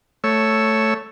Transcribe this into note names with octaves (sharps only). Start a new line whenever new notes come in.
A3 C#5 E6